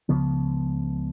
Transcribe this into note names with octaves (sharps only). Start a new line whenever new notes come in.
C#2 C#3 F3 B3